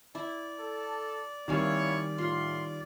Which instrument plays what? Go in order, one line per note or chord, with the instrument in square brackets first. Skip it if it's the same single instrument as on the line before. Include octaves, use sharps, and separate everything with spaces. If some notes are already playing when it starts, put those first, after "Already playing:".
[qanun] E4 [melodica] D5
[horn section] A4
[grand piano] D#3 G3 [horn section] A#3 E4 C#5 [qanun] C4 F5 G#5
[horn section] A2 C6 [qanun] F4